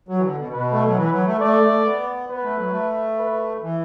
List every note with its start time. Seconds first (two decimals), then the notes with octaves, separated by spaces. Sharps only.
0.08 F#3
0.19 E3
0.23 D3
0.38 B2
0.53 B2 B4
0.72 A3
0.85 F#3
0.97 E3 B4
1.12 F#3
1.26 A3
1.41 A3 D5
1.63 A3
1.85 B3
2.29 B3 B4
2.43 A3
2.58 F#3
2.71 A3
3.19 B4
3.63 E3